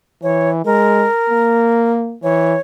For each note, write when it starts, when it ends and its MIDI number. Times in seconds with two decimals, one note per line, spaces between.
0.23 0.62 52
0.23 0.50 73
0.65 1.06 56
0.65 1.92 70
1.30 2.17 58
2.23 2.55 52
2.23 2.60 73